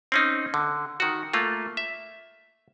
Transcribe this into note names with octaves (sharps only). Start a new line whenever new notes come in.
C4 C#4 D#4
D3
D#3 F#4
A3 A#3 F4
E5